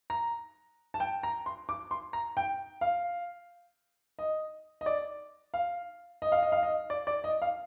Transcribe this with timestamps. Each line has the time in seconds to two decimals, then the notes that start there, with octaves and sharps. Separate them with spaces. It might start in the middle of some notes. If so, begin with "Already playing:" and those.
0.10 A#5
0.94 A5
1.00 G5
1.23 A#5
1.46 C6
1.69 D6
1.91 C6
2.13 A#5
2.37 G5
2.81 F5
4.19 D#5
4.81 D#5
4.86 D5
5.54 F5
6.22 D#5
6.32 F5
6.43 D#5
6.52 F5
6.63 D#5
6.90 D5
7.07 D5
7.24 D#5
7.42 F5